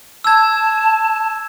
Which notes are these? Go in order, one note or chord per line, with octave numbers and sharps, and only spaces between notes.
A5 E6 G#6